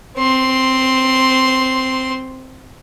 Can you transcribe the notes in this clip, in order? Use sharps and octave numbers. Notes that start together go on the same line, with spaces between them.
C4 C6